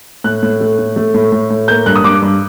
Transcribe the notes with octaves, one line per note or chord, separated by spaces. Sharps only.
A2 F#6
A2
A3
A2
A3
A2
A2
A2
A#3 G6
G2 F#6
D#6
G2 D6
G2